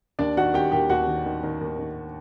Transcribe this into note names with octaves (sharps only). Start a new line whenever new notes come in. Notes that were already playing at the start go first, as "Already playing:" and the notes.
D#2 D4 D5
D#3 F#4 F#5
D#3 G4 G5
D#2 G4 G5
D#2 F#4 F#5
D#3
D#3
D#3
D#2
D#3